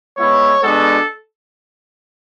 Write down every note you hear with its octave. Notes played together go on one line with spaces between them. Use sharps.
G#3 B3 E4 C#5
G#3 B3 D4 F#4 A4